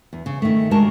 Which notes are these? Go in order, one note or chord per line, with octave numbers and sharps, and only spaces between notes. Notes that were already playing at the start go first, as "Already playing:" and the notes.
E2
C#3
D#3 A3
D#3 G#3 D4 F#4 A#4 A5